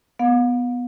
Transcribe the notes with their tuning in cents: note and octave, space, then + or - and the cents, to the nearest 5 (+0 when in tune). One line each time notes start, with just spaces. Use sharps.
B3 +0 F5 +40